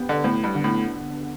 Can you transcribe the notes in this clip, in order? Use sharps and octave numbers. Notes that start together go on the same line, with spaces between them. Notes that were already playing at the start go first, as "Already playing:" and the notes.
Already playing: B3 G4
D3
A2 B3
G2
D3
A2